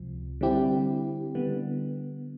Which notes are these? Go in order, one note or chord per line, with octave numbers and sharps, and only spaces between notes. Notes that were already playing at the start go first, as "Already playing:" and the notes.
Already playing: C#2 C3 F3
D3 G3 C4 E4 G4
D3 G3 B3